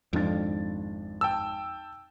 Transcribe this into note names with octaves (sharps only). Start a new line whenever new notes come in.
G#1 F2 D4 A6
G5 A5 E6